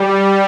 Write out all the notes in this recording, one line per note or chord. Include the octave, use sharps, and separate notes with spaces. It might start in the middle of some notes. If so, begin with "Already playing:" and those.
Already playing: G3